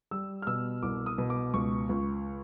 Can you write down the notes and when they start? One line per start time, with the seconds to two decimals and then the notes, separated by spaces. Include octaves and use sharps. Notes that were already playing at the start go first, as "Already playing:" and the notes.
0.11 G3 E6
0.42 F6
0.47 B2 E6
0.83 C2 D6
1.06 D#6
1.18 B2
1.30 D6
1.54 C#2 C#6
1.89 C#2